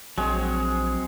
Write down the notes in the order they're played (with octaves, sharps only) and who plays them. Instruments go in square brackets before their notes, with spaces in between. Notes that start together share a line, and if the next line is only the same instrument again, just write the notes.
[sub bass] A#1 [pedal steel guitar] F#3 C4 C#5 [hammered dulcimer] G#3